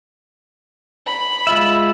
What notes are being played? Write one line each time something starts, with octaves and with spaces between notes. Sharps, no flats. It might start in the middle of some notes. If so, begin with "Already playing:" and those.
B5
G#3 F4 E5